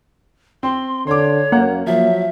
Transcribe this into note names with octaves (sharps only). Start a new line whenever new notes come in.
C4 C6
D3 C#5 C6 D6
F#2 A#3 F#5
F3 F#3 E5